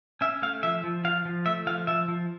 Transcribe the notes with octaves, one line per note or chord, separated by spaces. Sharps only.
C#4 E5
A3 F5
F3 E5
F3
F3 F5
F3
A3 E5
F3 F5
F3 E5
F3